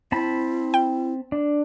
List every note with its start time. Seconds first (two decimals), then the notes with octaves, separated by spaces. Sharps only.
0.12 C4 E4 A5 B5
0.74 G5
1.32 D4